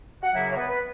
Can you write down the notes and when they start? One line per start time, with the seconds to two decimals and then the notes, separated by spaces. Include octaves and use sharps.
0.23 F#5
0.34 F#2 C#3 F#3 A#3 E4 E5
0.52 C#5
0.57 B3 B4
0.70 B4